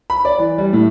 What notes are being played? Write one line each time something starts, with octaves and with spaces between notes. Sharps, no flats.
B5
D5
E3
G3
A2